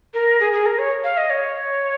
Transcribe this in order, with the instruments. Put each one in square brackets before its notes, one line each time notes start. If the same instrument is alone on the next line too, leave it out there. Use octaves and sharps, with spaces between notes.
[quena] A#4
G#4
G#4
A#4
C#5
F5
D#5
C#5